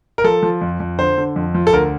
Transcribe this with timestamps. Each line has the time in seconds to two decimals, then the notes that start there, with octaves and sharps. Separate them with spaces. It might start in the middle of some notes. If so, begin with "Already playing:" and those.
0.18 A#4
0.24 F3 A4
0.43 F3
0.61 F2
0.80 F2
0.99 D3 C5
1.18 D3
1.36 F2
1.55 F3
1.67 A4
1.73 D2 A#4